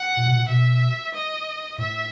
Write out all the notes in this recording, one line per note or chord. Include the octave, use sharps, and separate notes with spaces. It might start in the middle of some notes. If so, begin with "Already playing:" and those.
Already playing: F#5
A#2
B2
A#2
B2 E5
D#5
A2 E5